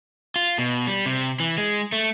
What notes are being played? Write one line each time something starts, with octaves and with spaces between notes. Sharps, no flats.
F4
B2
G3
C3
E3
G#3
A3